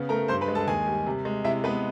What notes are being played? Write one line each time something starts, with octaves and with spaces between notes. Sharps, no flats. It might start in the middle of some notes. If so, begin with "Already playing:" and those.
Already playing: C#3 B3
A3 A#4 A#5
G2 C5 C6
B4 B5
G#3
A4 A5
D#2 G#4 G#5
G3
C3
G#3
C3 E4 E5
G#3 B3 B4